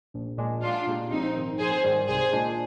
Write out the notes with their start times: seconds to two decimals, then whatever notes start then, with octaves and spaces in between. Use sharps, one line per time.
0.14 A#1
0.37 A#2 G#3 D4
0.62 A#1 D4 F4
0.87 A#2 G#3 D#4 G4
1.11 A#1 C4 D#4
1.36 G#2 D#3
1.59 A#1 G#4 C5
1.84 G#2 D#3 G3
2.08 C2 G#4 C5
2.33 A#2 G#3 D4